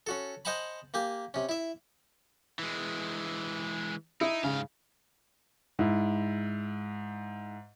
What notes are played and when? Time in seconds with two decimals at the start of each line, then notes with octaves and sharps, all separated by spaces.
0.07 C#4 F#4 A4
0.45 C5 D#5 F#5 G#5 A5 B5
0.94 A#3 G4 G#5
1.34 C3 C#4
1.49 E4 E5
2.59 E3 G#3
4.21 D#4 E4
4.44 G#2 C#3 F5
5.79 G#2 E4